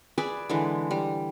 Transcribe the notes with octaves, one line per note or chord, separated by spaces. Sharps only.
G#4 B4 D5 E5
D3 E3 G#3
G3